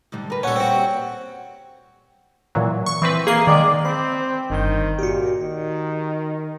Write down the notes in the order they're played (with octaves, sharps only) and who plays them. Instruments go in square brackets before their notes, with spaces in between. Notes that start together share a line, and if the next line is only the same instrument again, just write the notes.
[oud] G#2 D3 G3
A#4 B4
[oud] A#2 G3 [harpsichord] C#4 A4 [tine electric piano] C#5 F#5
[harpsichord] C4 F#4
[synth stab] A#2 E3 F#3
C#6
E3 C4 B4
[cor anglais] A#3 [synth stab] G#4 C7
[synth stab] D#3 G#3 [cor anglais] D5
[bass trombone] C4 [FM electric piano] B5
[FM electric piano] G1 G2 G6 [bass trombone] D#3
[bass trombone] A#2 [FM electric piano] F#4 G4
[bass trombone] D#3